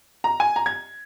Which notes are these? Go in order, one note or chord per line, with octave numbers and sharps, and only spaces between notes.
A#5
G#5
A#5
G#6